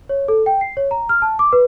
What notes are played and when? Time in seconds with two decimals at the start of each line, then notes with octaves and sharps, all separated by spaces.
0.09 C#5
0.28 A4
0.46 G5
0.61 C7
0.77 C#5
0.91 A#5
1.09 F6
1.22 A5
1.39 D6
1.53 B4